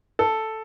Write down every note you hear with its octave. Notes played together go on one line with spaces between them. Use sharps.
A4